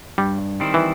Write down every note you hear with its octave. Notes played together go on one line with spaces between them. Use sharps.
G2 G3
D#3 G3 C4 E4
E3